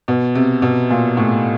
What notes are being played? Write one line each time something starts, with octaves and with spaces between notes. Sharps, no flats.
B2
C3
B2
A#2
A2